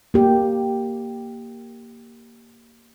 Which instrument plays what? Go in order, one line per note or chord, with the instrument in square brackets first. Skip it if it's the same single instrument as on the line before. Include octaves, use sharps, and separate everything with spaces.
[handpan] A#3 G4